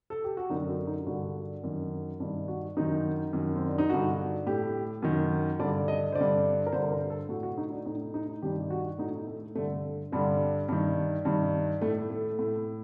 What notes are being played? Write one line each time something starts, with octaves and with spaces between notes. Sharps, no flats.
A4
G4
F#4
F#2 D3 D#4
F#4
D#4
G2 D3 F#4
F#2 D#3
G2 D#3
F#4
F#2 D#3 D#4
F#2 D#3
C4
D4
D#4
G2 D3 F#4
A2 G4
F#2 D#3
G2 D3 D5
D#5
C5
D3 D5
G2
A#4
G2 D3 C5
A#4
A4
A2 F#4
F#4
D#4
D4
A2 D#4
D#4
G2 D#3 G4
F#4
A2 D#4
A3
G2 D3 A3
G2 D3 G3
G2 D#3
G2 D#3
A2 A3
A3
A2